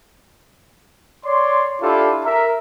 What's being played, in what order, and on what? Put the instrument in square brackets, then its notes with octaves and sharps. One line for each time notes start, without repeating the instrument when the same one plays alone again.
[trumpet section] C#5 D5 C6
D4 E4 F4 G4 A4
A#4 E5